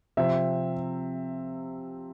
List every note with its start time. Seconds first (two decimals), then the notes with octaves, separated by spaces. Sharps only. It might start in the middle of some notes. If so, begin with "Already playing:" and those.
0.17 C3 F3 C4 E5